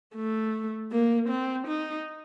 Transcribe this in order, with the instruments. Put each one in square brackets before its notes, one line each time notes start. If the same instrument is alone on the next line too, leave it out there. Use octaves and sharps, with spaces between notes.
[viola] A3
A#3
C4
D#4